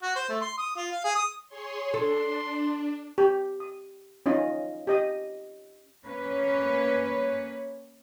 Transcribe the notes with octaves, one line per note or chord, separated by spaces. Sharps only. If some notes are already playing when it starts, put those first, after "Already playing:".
F#4
C5
A3
C6
D#6
F4
F5
G#4
D#6
G#4 C#5 C6
D4 A4 C6
G4
D#6
C#4 D#4 F4 D#5
G4 D#5 D#6
A#3 C#4 B4 C#5